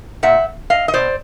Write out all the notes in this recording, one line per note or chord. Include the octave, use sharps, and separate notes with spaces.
A#2 E5 F#5
D#5 F5
D#5
B2 C5 D5